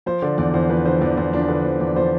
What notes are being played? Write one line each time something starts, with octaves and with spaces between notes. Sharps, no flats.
F3 C5
D3 D5
E2 D5
E2 C5
F3 B4
D3 C5
E2 D5
E2 C5
F3 D4
D3 B4
E2 C5
E2 D5
F3 C5